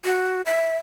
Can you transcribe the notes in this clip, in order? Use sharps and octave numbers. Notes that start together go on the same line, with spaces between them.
F#4
E5